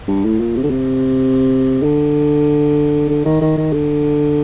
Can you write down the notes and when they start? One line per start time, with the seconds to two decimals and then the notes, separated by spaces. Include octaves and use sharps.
0.08 G2
0.24 A2
0.40 A#2
0.56 C3
0.63 D3
0.70 C3
1.83 D3
3.09 D3
3.25 D#3
3.41 D#3
3.57 D#3
3.73 D3